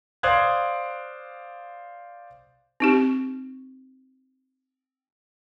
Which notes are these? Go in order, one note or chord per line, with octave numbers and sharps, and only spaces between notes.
C5 D5 F5 D#6 F#6 G#6
C4 D#4 G4